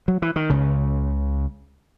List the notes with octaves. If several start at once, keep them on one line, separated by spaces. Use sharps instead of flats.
F#3
E3
D#3
C#2 C#3